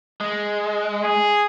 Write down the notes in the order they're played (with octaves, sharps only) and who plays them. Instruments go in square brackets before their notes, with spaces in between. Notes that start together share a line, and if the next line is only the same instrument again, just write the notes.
[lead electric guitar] G#3
[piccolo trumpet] G#4